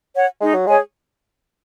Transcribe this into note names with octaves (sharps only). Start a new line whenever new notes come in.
C#5 F#5
G#3 D#4
F#3
G#3 G#4 C#5 G#5